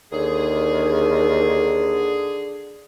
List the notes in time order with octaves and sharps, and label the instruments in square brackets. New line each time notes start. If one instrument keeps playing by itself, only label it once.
[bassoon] D#2 [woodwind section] D3 G#4